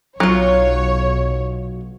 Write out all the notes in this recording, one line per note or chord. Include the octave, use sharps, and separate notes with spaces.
B1 F#3 F4 C#5